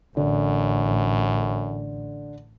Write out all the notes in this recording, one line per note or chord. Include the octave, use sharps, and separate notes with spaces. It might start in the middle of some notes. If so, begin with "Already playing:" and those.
A1 F#2 D3